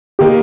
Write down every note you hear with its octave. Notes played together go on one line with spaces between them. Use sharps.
D#3 A#3 D#4 G4